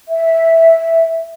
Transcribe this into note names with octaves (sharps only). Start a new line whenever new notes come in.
E5